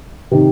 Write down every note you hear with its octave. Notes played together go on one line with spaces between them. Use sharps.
C3 D#3